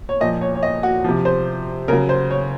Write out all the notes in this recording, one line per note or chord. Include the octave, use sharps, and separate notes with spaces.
C#5
A#2 F3 D#5
C#5
C#5
D#5
F#4
C3 F3
C5
C#3 F#3 A#4
C5
C#5